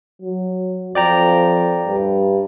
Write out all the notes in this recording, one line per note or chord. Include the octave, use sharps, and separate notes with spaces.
F#3
F2 D5 G5 A#5
G2